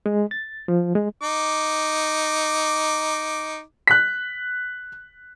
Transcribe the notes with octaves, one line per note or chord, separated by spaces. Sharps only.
G#3
A6
F3
G#3
D#4 D6
F#6 B6